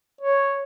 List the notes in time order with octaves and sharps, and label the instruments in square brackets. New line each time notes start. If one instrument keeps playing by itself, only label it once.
[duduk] C#5